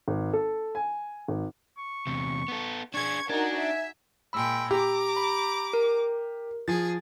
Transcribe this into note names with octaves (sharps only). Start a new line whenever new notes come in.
G#1
A4
G#5
G#1
C#6
E2 C3
B3 A4
D4 G#4 C#6 G#6
D4 D#4 F#4 A#4 G#5
E5
A#2 G#3 G5 B5 E6
G4 A#5 D6
B5
A#4
F3 G#4 A6